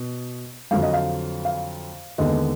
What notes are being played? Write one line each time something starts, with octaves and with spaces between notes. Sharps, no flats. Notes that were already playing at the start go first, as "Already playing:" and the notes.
Already playing: B2
F2 D3 F#3 F5
D#5
F5
F5
D#2 D3 G#3 B3 D#5